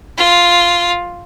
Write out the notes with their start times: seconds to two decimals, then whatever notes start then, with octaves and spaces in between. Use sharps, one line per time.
0.18 F4